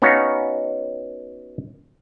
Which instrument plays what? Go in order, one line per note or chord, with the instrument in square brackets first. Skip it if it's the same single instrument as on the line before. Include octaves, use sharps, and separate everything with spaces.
[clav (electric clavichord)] B3 C#4 D#4 F#4 C#5 F5